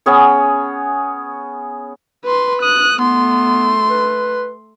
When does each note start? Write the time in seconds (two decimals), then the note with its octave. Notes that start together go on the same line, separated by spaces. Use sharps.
0.06 B3 C#4 G#4 C#5
2.25 B4 C6
2.62 D#6 F#6
2.99 A3 B3 C6
3.90 B4